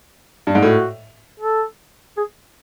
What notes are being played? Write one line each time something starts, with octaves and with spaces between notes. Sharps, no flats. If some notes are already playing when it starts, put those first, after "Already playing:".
G2
G#2
A2 F#4
A4
G#4